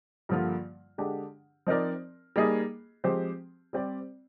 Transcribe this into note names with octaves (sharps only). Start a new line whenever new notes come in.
G2 D3 F3 A#3 F4
D3 G#3 D4 G4
F3 C4 D#4 A#4 D5
G3 A#3 D#4 G#4 D#5
F3 G#3 C4 G4 C5
G3 C4 G4 D5